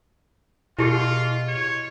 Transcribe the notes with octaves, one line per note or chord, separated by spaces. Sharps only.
B2 E4 F4 G4 G#4
C#5